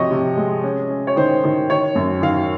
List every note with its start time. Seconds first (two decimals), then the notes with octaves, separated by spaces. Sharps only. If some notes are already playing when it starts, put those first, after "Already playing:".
Already playing: C3 F3 C#5 D#5 C#6
0.11 C3
0.37 G#3
0.64 C#4
0.90 C#4
1.07 C#5
1.16 D#3 C5
1.44 D#3
1.70 D#3 C#5
1.95 F#2
2.22 D#3 F5